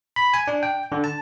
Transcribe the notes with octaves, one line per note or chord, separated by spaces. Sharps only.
B5
G#5
D4
G5
D3
A5